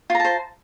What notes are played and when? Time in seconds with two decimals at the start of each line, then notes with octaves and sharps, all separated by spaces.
0.10 F4
0.15 A#5
0.20 A5
0.25 C5